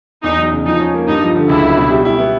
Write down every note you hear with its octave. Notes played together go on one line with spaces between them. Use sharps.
E2 D#4
F#3
C#3
F3 D#4
C#4
A#3
G2 D#4
F3
D3
C#2 E4
F#3
B2
G3
E4
B3